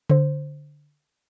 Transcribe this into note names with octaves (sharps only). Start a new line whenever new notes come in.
D3 C5